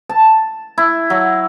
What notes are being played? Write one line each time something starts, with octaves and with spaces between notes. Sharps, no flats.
A5
E4
F#3